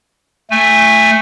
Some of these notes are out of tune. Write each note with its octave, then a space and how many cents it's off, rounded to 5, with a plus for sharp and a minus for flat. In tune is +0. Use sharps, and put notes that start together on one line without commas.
A3 +0 G#5 -25